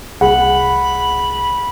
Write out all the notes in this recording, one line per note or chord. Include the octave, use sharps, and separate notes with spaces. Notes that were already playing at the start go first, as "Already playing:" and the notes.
C2 G#4 F#5 B5